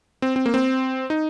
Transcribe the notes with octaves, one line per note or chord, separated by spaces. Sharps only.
C4
C4
A#3
C4
D#4